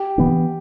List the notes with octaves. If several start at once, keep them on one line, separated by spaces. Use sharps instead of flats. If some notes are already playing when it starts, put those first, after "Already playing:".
Already playing: G4
E3 B3 D4